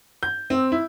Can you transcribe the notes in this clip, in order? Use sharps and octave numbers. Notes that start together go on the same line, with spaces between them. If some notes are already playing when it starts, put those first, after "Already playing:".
G6
C4
E4